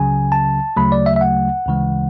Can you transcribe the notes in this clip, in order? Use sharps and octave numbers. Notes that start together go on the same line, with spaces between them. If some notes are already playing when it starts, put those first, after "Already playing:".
Already playing: C#2 C#3 F#3 G#5
A5
D2 C#3 F#3 A3 B5
D5
E5
E5
F#5
D2 C#3 E3 G#3